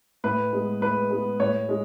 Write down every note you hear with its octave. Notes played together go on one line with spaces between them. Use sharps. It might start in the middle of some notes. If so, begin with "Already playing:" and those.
A2 B4
G#3 B3
A2 B4
G#3 B3
A2 C#5
G#3